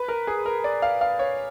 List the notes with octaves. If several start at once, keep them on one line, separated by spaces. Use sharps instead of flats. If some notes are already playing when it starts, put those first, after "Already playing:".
Already playing: B4
A#4
G#4
A#4
D5
F5
F5
C#5